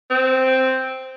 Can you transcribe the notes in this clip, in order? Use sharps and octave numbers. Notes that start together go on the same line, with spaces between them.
C4